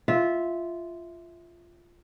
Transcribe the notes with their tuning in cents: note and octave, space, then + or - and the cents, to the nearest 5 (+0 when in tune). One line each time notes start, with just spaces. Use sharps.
F4 -10 E5 -10